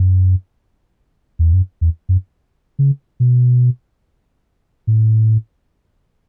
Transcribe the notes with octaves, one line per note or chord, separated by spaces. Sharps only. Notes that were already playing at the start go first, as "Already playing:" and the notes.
Already playing: F#2
E2
F#2
E2
F#2
C#3
B2
A2